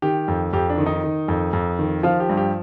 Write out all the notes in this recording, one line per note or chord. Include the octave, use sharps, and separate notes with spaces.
D#3 G4
F2
F2 G4
D4
D#3
D#4
D#3
F2
F2
D#3
F3 F4
G4
G2
G4